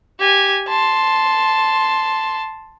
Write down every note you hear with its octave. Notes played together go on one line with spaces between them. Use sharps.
G4 G#5
A5 C6